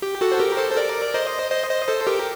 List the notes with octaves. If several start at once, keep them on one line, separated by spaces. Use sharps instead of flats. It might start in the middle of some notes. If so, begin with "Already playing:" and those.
G4
F#4 A4
C5
G4 A#4
A4 C5
C5
A#4 D5
C5 D#5
C5 D#5
C5 D#5
A4 C5
G4 A#4